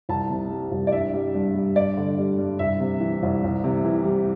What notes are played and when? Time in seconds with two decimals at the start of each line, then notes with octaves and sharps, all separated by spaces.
0.09 C2 A5
0.30 C3
0.51 G3
0.71 C2
0.87 D5
0.92 G2 E5
1.14 G3
1.34 G2
1.55 G3
1.76 G2 D5
1.97 D3
2.18 G3
2.38 G2
2.59 C2 E5
2.80 C3
3.01 E3
3.23 C2
3.44 C2
3.64 C3
3.85 E3
4.05 G3